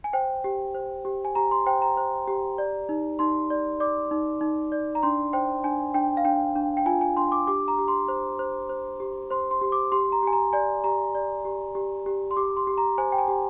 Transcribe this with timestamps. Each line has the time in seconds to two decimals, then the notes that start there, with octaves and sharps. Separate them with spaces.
0.04 G#5
0.13 C5 G5
0.44 G4
0.74 C5
1.05 G4
1.25 G#5
1.35 G4 A#5
1.51 C6
1.66 C5 G5
1.82 A#5
1.97 C5
2.28 G4
2.58 D5
2.89 D#4
3.19 D#4 C6
3.50 D5
3.80 D5 D6
4.11 D#4
4.41 D#4
4.72 D5
4.95 A#5
5.03 D4 C6
5.33 C5 G5
5.64 D4 G#5
5.94 D4 G5
6.17 F5
6.25 D4 G5
6.55 D4
6.77 G5
6.86 F4 G#5
7.01 G#5
7.17 D4 C6
7.32 D6
7.47 G4 D6
7.68 A#5
7.78 G4
7.88 C6
8.08 C5
8.39 C5
8.70 C5
9.00 G4
9.31 C5 C6
9.51 C6
9.61 G4
9.72 D6
9.92 G4 C6
10.12 A#5
10.23 G4 G#5
10.33 A#5
10.53 D5 G#5
10.84 G4 A#5
11.15 D5
11.45 G4
11.75 G4
12.06 G4
12.31 C6
12.37 G4 D6
12.57 C6
12.67 G4
12.78 A#5
12.98 C5 G#5
13.12 G5
13.18 G#5
13.28 G4